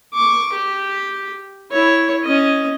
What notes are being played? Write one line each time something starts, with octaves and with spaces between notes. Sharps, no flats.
C#6 D6
G4
E4 C#5
C#4 D#5